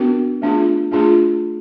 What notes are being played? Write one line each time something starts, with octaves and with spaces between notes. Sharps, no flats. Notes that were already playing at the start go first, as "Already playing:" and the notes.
Already playing: B3 D4 F#4 A#4
A3 D4 F4 G#4
A3 D4 F4 G#4